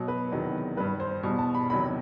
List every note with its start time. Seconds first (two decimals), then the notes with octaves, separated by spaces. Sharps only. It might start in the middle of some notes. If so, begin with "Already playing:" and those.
Already playing: B2 F#3
0.08 B4
0.31 E2 C3 D#3 F#3
0.77 G2 D#3 G3 B4
1.00 C5
1.23 E2 B2 G3
1.39 A5
1.55 B5
1.70 E2 C3 D#3 F#3 B5